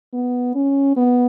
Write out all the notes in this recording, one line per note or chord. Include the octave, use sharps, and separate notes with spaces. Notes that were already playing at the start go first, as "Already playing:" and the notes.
B3
C#4
B3